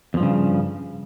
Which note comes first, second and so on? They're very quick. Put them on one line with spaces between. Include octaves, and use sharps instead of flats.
E2 F3 G2 C#3